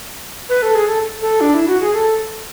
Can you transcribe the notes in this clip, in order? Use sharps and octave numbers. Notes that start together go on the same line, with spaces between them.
B4
A4
G#4
A4
A4
D4
E4
F#4
G#4
A4